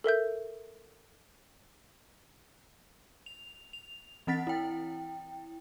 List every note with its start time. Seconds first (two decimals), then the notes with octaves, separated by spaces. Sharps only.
0.04 A4 A#4 E5 G6
3.26 F7
3.73 F7
4.27 E3 C4 F#5 A6 B6
4.47 E4 G5